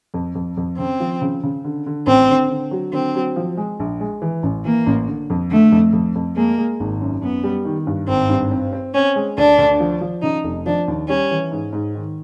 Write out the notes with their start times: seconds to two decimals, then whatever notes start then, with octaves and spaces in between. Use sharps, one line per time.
0.14 F2
0.35 F2
0.57 F2
0.78 C#3 C4
1.00 F3
1.22 C#3
1.43 C#3
1.65 D3
1.86 D3
2.07 A1 C4
2.29 D3
2.50 D3
2.71 F#3
2.93 D3 C4
3.15 F#3
3.36 F3
3.57 G#3
3.80 A#1
4.00 G#3
4.22 E3
4.43 A1
4.65 E3 A#3
4.87 A1
5.08 D3
5.30 F2
5.51 D3 A3
5.72 F2
5.93 F2
6.15 F2
6.36 G#3 A#3
6.58 G#3
6.80 G#1
7.01 F#2
7.22 F#2 B3
7.44 G3
7.65 D#3
7.87 G2
8.08 G#1 C4
8.30 G2
8.51 C4
8.73 C4
8.94 C4 C#4
9.16 G#3
9.37 D2 D4
9.58 D2
9.80 F3
10.01 F3
10.22 C#3 D#4
10.44 F1
10.66 F3 D4
10.88 D#2
11.08 G3 C#4
11.31 E3
11.52 G#2
11.73 G#2
11.95 D#3